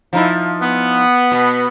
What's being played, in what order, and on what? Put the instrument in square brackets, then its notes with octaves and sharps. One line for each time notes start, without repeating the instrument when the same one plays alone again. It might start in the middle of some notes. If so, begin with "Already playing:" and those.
[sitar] F3 D#4 E4
[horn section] B3
[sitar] B2